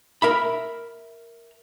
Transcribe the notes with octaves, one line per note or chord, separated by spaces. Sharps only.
A#4 E5 B5